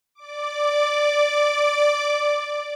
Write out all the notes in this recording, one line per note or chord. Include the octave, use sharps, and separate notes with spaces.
D5 D6